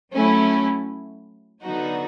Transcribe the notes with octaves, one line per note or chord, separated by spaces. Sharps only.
F#3 A3 C#4 E4
D3 F#3 B3 D#4 F#4